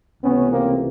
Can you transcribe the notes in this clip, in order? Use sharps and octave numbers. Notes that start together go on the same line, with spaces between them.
C#2 C3 E3 A3 B3 C#4
A#3 C4